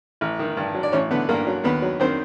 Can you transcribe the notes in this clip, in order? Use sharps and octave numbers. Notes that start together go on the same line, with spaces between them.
A1
D#3
G2
F#3
D5
A1 C#4 C#5
D3 B3 B4
G2 A#3 A#4
F#3
D#2 B3 B4
F#3
D#3 C4 C5